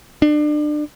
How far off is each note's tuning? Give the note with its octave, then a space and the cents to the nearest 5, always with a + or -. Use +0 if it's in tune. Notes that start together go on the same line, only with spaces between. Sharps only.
D4 +30